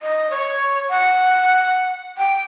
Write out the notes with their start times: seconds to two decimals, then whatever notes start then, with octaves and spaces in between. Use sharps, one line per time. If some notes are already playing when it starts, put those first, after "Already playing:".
0.01 D#5
0.30 C#5
0.90 F#5
2.17 G5